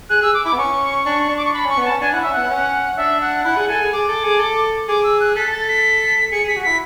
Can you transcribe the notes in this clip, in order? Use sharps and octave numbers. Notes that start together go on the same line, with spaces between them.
G#4 F#6
G#4 E6
D6
E4 D6
B3
C#4 C#6
D4
D4
D6
C#6
D4 B5
C#4 C#6
B3
C#4 A5
D4 G#5
E4 F#5
C#4 E5
B3 F#5
C#4
D4 E5
F#5
E4 F#5
G#4
A4 G#5
G#4
G#4 D6
A4
G#4
A4
G#4 D6
E6
F#6
A4 B6
A6
B6
G#4 C#7
G#4 B6
F#4
E4 B6